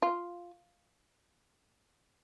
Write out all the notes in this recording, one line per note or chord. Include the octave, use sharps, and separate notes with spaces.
F4